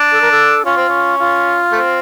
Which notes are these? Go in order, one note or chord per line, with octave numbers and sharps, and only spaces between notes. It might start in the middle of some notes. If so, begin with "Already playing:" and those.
Already playing: D4
A4
A#4
A4
C#4 F4
C4
C#4
F4
A3 C4